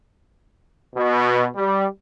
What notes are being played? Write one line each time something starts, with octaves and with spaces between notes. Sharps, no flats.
B2
G3